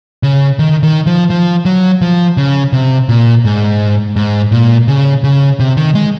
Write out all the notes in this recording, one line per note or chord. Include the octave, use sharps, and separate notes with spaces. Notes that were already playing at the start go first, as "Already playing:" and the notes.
C#3
D#3
D#3
F3
F3
F#3
F3
C#3
C3
A#2
G#2
G#2
A#2
C#3
C#3
C3
D#3
G#3